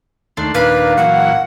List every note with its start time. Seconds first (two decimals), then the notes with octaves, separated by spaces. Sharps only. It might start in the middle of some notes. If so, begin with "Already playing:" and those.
0.37 D#2 A3 D4 C6
0.55 D#2 A#2 D4 B4 F5
0.97 A#2 E3 F#3 F#5